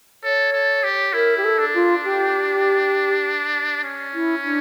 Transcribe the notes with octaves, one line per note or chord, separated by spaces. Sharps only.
A4 C#5
A4
G4
E4 A#4
G4
A4
D4
F4
G4
C#4
E4
D4